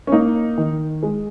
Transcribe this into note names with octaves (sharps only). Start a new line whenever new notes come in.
C#4
A#3 D#4
D#3
G#3